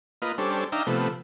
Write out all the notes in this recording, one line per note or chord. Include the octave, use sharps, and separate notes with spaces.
A#3 F4 B4 D#5
G3 C#4 D4 A4 C5
D4 D#4 E5 F5 G5 A#5
C3 F3 A3 B3